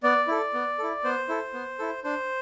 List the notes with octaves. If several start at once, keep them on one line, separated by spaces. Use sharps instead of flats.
B3 D5
E4 A4
B3
E4 A4
B3 C5
E4 A4
B3
E4 A4
D4 C5